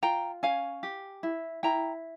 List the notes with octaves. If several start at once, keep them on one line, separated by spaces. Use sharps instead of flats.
F4 G5 A#5
C#4 F5 G#5
G4
E4
E4 G5 A#5